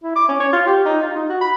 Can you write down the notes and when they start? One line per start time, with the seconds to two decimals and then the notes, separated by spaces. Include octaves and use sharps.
0.03 E4
0.16 D6
0.29 C#4
0.40 C#5
0.52 F4
0.66 G4
0.86 D#4
1.02 F4
1.16 D#4
1.29 F#4
1.41 B5